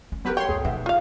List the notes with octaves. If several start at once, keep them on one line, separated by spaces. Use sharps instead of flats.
C#4
F#3 B3 F#4 G4 A#4 B4
C#5 G5 C6
C#2 F#2 G#4 A#5
B2 F3 D#4 E5 F#5
F4 F5